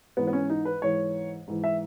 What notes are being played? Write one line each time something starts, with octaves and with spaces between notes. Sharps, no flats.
G#2 E3 B3
B3
C#4
D#4
B4
G#2 E3 C#5
G#2 E3
E5